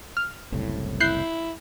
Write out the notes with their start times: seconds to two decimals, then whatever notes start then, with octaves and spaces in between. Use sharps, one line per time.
0.17 F6
0.52 F#1 C2 A2
1.00 E4 F#6 G6 C7